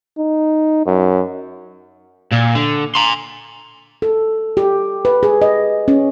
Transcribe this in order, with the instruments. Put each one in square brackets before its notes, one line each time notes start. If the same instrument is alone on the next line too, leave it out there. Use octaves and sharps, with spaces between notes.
[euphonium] D#4
F#2
[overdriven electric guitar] A#2
D3
A#5 C6
[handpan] A4
G4
B4
G#4
D#5
C#4